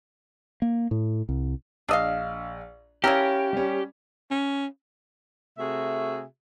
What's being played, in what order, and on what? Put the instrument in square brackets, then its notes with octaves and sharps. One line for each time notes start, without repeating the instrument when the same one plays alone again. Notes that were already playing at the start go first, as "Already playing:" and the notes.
[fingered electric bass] A#3
A2
C2
[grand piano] A#1 E6 [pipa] D4 D#5 F5
[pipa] C#3 E4 A#4 [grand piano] C#4 C#5 [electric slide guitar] G4
[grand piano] G3 C#4
[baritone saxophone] C#4
[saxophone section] C3 A3 F#4 G#4 E5